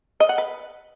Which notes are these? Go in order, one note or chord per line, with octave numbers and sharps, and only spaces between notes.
D#5
F#5
B4